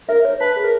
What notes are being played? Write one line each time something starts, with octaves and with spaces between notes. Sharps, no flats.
A#4 E5
C#5
B4 A5
G#4
A#4